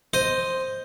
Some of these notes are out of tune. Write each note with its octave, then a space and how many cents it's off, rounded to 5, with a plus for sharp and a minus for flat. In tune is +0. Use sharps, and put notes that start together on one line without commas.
C5 +0 D#5 +0